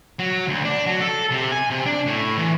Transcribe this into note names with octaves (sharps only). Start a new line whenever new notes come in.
F#3
D2
D4
F#3
A4
C3
G#5
C3
D4
A2
E3